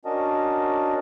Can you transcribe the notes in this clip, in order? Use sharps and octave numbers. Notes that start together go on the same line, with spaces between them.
C#4 D4 F#4 A#4 D#5 A5